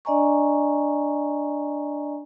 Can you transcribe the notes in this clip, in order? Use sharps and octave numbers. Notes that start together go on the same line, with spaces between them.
D4 D5 D#5 G#5 A#5 C#6